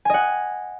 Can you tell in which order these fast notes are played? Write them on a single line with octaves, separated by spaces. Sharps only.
G#5 D#5 F#5